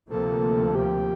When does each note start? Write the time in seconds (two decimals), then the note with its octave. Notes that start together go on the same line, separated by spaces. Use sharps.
0.09 D2 C3 F3 A#3 A4
0.75 G4